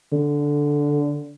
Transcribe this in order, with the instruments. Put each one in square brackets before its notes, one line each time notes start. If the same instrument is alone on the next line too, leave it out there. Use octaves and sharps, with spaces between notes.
[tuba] D3